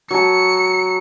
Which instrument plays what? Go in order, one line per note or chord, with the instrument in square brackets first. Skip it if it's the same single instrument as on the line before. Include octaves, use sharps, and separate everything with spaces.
[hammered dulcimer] F#3 A5 [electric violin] C#7